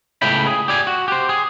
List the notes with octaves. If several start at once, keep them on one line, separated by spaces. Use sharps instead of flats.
C#2 C#3 A3 E4 G5 B5
G#4
G4 D5 G#5
F#4
G4 C5
G#4